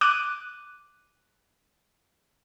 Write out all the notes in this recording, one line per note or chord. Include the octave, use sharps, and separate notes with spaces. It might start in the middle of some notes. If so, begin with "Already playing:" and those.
D6 F#6 D#7